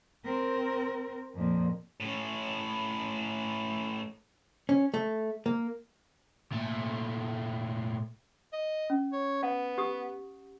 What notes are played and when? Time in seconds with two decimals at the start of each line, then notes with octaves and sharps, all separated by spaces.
0.25 C4 A#4
1.35 F2 A#2
2.00 A2 C#4
4.69 C#4
4.94 A3
5.46 A#3
6.52 A#2 A3
8.52 D#5
8.90 C#4
9.12 C#5
9.43 B3 F#5
9.78 G4 D#6